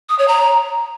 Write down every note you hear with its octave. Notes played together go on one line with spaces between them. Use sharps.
D#6
C#5
A#5